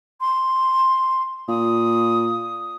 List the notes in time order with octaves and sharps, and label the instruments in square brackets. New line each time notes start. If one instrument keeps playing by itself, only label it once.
[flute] C6
[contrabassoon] A#2 [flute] D#6